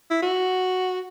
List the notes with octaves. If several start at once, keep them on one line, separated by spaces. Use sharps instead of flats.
E4
F#4